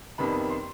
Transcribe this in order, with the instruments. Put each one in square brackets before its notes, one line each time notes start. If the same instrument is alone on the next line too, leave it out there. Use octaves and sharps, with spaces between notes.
[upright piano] F2 C3 D#3 G3 B3 B5
C6